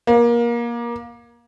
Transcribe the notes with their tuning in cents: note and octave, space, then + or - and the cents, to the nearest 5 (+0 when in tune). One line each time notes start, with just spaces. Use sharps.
A#3 +25